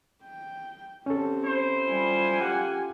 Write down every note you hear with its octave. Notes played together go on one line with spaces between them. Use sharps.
G5
C4 C#4 G4 A4
E4 C5
G3 F4 G#5
A#3 G4 F#5